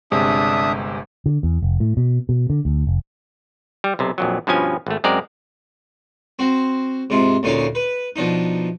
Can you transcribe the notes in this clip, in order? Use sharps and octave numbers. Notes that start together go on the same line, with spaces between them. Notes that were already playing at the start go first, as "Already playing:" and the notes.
G1 C3 G#3 D4 E5 D#6
D3
E2
F1
A2
B2
B2
D3
D2
F1
G3
B1 C3
A#1 F2 F#3
G2 B2 F3 C#4 G#5
G#1 A3
F#2 G#3 C4 A#4 D5
C4 F#4
G#2 C3 F4
D2 A#2 C#4 D#4 F5
B4
B2 F3 D4 D#4